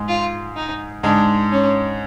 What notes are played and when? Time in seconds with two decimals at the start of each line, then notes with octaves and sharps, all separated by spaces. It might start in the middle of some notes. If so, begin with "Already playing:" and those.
Already playing: G#2 G#3
0.08 F4
0.56 D#4
1.03 G#2 G#3 D4
1.52 C#4